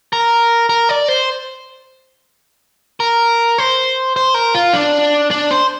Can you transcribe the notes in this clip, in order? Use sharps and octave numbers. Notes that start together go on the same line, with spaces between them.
A#4
A#4
D5
C5
A#4
C5
C5
A#4
F4
D4
D4
C5